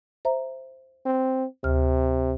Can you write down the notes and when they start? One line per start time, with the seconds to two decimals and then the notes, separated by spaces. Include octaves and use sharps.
0.25 C5 E5 A#5
1.06 C4
1.64 D2 C3 F6